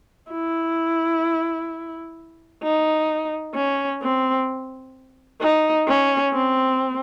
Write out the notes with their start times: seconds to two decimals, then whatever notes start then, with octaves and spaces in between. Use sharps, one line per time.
0.31 E4
2.63 D#4
3.55 C#4
4.02 C4
5.41 D#4
5.88 C#4
6.34 C4